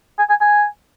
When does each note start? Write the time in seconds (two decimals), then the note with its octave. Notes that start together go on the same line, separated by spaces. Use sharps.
0.19 G#5
0.29 G#5
0.41 G#5